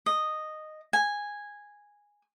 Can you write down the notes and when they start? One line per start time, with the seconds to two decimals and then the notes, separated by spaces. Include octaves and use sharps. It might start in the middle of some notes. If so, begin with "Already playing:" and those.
0.06 D#5
0.93 G#5